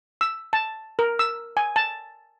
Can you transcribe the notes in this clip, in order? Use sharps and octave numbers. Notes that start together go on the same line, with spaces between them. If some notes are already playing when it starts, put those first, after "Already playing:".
E6
A5
A#4
E6
G#5
A5